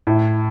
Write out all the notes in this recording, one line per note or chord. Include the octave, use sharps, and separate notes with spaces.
A2